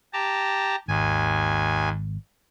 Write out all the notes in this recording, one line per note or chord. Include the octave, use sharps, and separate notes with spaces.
G4 A5 A#5
G#1 D#2 G#5